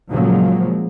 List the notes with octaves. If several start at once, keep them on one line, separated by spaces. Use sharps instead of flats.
A#2 C#3 F3 F#3 G#3 A#3